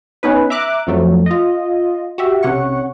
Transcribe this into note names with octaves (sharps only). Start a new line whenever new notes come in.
B3 C#4 D#4 B4
E5 A#5 D6 F#6
F2 F3 F#3 A3
F4 D#5
F#4 G4 E5
B1 C3 C#4 F#5 C#6